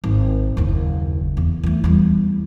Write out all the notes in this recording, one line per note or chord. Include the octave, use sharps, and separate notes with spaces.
G#1
F#1 D#2
E2
E2 A3
E2 G3